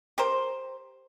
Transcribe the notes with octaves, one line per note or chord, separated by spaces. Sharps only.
G4 A#4 C5